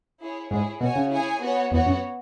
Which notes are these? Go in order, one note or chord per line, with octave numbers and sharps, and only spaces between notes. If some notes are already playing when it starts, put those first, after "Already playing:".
E4 G#4 C#5
G#2 E4 G#4 C#5
B2 F#4 C#5 G#5
C#3
E4 G#4 C#5 G#5
B3 F#4 C#5
E2 B3 F#4 C#5
F#2